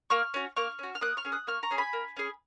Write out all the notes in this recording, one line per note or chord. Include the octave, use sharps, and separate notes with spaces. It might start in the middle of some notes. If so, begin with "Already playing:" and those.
A#3 C#6 F6
C#4 F#4
A#3 C#6 F6
C#4 F#4
F6
A#3 D#6 F#6
C#6 F6
C#4 G#4
D#6 F#6
A#3 C#6 F6
A#5 C#6
C#4 G#4
G#5 B5
A#3
C#4 G#4